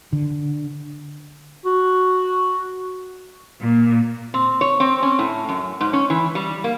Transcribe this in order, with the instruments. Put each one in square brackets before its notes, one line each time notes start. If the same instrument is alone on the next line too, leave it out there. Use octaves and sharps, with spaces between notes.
[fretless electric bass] D3
[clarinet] F#4
[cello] A#2
[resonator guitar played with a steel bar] C4
C#5
C4
C#4
A2
F#2
G#2
C#4
E3
G3
A#3